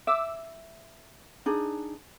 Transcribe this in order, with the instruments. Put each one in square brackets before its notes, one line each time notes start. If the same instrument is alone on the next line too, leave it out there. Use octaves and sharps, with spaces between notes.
[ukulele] E5 [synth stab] D6 E6
[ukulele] D4 D#4 G#4